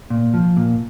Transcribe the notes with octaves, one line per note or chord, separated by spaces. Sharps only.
A#2
F3
A#2